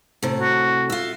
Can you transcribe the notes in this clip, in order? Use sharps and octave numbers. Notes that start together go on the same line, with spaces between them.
A2 C3
F#4
F4 E5